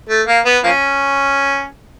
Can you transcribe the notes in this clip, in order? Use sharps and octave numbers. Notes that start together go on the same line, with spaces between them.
A3
A#3
B3
F3 A#3 C#4